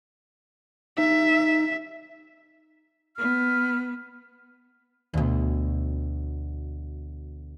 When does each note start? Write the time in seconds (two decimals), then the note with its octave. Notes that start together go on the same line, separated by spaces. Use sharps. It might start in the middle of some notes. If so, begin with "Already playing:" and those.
0.98 D#4 E5
3.17 B3 F6
5.14 D2 B2